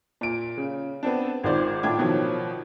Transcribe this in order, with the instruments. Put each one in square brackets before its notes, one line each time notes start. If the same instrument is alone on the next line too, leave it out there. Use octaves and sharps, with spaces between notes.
[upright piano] A#2 D7
C#3
B3 C4 D4
G#1 D#3 F4 C5 D5
A2 D4 F4 G5 D6 G#6
B2 D#3 F3 F#3